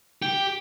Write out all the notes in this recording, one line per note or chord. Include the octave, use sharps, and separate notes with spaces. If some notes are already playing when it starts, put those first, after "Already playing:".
G4